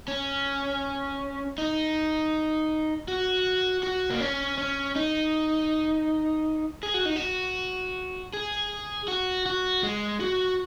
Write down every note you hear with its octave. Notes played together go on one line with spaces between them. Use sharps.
C#4
D#4
F#4
F#4
A#3
C#4
C#4
D#4
G#4
F#4
D#4
F#4
G#4
F#4
F#4
G#3
F#4